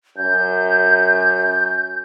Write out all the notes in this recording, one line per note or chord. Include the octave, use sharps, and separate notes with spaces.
F#2 G6